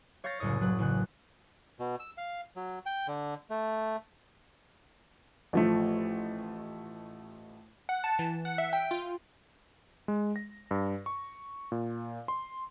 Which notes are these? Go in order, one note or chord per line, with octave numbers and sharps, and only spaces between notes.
C#5 F5 C#6 G6 A6 A#6
F#1 C2 A2 C#5 D#6
F#3 B4
A1 C#3 F#6
B2
E6
F5
F#3
G5
D3
A3
A1 F3 A3
F#5
A5
E3
F#5
E5
G5
F4
G#3
A#6
G2
C#6
A#2
C6